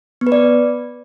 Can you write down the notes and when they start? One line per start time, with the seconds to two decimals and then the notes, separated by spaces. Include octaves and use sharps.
0.21 B3
0.27 B4
0.32 D5